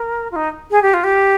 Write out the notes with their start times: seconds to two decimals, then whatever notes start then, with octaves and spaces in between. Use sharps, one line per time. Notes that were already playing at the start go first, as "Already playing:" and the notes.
Already playing: A#4
0.31 F4
0.36 D#4
0.71 G#4
0.82 G4
0.94 F4
1.04 G4